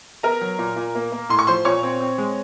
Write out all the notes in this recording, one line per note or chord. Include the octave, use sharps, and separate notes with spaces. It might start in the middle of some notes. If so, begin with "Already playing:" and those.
B3 A#4 A#5
F#3
A#2
A#2
A#3
A#3
A2 C6
C#6
F3 C5 C6
A#2 C#5 C#6
C4
C4
G#3